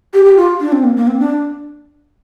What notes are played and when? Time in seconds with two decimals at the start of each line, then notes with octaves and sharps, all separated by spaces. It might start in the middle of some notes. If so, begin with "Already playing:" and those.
0.14 G4
0.25 G4
0.36 F4
0.61 D4
0.72 C4
0.83 A#3
0.96 A#3
1.07 C4
1.19 D4